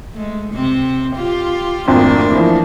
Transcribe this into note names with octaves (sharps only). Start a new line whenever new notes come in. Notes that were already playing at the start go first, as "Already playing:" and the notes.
G#3 A3
C3 C4
F4 G4
G#1 F2 A3 A#3 D4
E3 F3